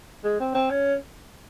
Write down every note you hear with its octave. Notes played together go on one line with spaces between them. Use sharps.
G#3
C4
C4
C#4